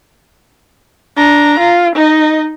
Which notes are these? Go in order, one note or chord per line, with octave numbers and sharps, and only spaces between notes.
D4 A#5
F4
D#4 D#5